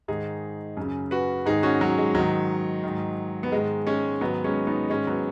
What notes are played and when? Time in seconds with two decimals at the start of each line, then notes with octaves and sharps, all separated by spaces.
0.08 G#2 D#3 D#4 G#4
0.77 F#2 C#3
1.11 F#4 B4
1.46 G#2 D#3 D#4 G#4
1.63 C#4 F#4
1.81 F#3
1.98 G#3
2.15 G#2 D#3 F#3
2.84 G#2 D#3
3.43 B3
3.52 G#2 D#3 G#3
3.87 G#3 C#4
4.21 G#2 D#3 F#3 B3
4.44 G#3 C#4
4.67 B3 D#4
4.90 G#2 D#3 G#3 C#4
5.07 F#3 B3